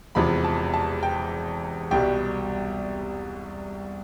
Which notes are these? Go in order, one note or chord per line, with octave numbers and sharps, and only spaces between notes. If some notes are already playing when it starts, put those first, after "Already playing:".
E1 E2 C3 F3 B5
A5
A5
G5
C2 B2 G3 G5